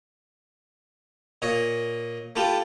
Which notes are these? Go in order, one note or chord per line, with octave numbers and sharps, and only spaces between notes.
A#2 C#5 D#5
A3 E4 F4 G4 A4